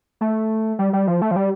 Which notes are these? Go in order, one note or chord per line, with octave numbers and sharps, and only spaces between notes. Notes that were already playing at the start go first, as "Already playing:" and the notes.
A3
G3
G3
F3
A3
F3
G3